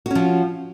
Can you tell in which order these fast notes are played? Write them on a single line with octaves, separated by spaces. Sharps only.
F#4 C#4 F3